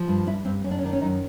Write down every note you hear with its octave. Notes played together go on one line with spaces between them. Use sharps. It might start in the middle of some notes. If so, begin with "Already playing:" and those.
Already playing: F3
G2
G2 E4
G2 C4
F#2 C#4
D4
C#4
D#3 D4
C#4
F#2 D#4